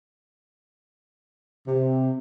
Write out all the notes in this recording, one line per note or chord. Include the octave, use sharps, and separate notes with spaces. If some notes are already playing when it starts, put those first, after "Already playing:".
C3